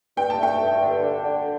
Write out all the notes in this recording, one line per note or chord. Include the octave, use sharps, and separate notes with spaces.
G2 G5
A5
A3 G5
G2
D3
D4
D3